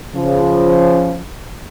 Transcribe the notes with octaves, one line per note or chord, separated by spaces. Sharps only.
C#3 F3